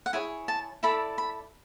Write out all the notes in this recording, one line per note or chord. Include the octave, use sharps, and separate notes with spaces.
F#5
E4 G#4 C#5 G#5
A5
E4 A4 D5 B5
B5